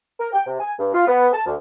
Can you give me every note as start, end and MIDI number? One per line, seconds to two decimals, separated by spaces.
0.20 0.28 70
0.33 0.43 79
0.47 0.60 48
0.60 0.73 80
0.79 0.91 43
0.94 1.04 65
1.07 1.28 59
1.33 1.45 81
1.46 1.54 38